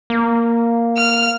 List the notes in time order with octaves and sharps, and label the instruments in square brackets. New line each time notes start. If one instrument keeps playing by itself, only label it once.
[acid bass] A#3
[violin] F6